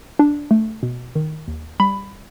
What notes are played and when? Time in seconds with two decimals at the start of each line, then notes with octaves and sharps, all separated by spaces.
0.19 D4
0.51 A3
0.83 B2
1.15 D#3
1.48 D#2
1.80 G3 B5